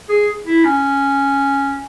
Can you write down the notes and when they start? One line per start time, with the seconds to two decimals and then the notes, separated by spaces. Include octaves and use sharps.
0.09 G#4
0.46 E4
0.65 C#4